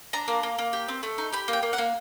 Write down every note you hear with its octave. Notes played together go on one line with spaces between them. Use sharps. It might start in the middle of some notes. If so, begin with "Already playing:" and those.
D4 A#5
A#3
A#3
A#3
G4
C4
A3
D#4
G4 B5
A#3
G5
A#3
F#5
A#3